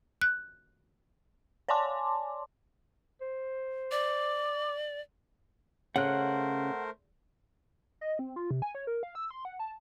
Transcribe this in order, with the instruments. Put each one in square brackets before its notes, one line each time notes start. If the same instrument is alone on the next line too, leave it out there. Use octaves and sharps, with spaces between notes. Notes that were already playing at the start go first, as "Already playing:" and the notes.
[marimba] F#6
[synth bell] C#5 D5 G#5 A5 C6 D6
[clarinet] C5
[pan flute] D5 [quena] D6
[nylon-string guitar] C#3 [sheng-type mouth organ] A3 A#4 C5 [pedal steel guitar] F#5 F#6
[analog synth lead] D#5
C4
F4
C3
G#5
C#5
A#4
F5
E6
C6
F#5
A5